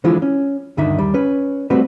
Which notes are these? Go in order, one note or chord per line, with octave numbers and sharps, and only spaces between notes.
D3 E3 F3 G#3 E4 F4
C#4
D2 G2 D3 D#3 D#4 E5
D#2 G3
C#4 B4
G3 A3 C4 F#4 B4